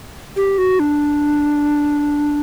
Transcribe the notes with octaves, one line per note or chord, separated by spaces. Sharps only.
G4
F#4
D4